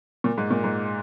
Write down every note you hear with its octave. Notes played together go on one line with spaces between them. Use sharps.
A#2
G#2
A#2
G#2